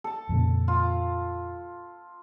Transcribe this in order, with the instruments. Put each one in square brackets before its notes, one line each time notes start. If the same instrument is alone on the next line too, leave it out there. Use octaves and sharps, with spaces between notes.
[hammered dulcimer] A4 A5
[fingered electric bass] F2 A#2 C#3
[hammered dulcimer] F4